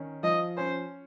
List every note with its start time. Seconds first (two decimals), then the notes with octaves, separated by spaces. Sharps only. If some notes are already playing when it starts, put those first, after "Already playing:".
Already playing: D#3 C#4
0.23 F3 D#5
0.57 C#4 C5